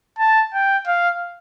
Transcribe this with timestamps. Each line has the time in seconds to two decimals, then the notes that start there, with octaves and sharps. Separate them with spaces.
0.19 A5
0.54 G5
0.87 F5